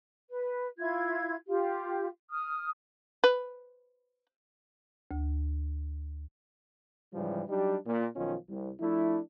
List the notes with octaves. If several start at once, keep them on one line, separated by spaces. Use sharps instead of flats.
B4
E4 F4 G#6
F4 G4
D#6 F6
B4
D2
G#2 C#3 E3 F3 G3
F#3 G3 D4 D#4 G4
A#2
B1 D#3 F3 C#4 D#4 F4
C2
F3 A3 D4 E4